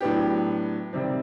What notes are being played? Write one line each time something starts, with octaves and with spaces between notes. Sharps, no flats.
A2 F#3 B3 D4 G4
C3 D#3 G3 C4